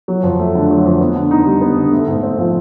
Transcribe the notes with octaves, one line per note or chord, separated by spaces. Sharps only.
F#3
F2
A3
D3
F#3
F2
B3
D3
D#4
G3
B3
D3
A3
G#2
C4
F3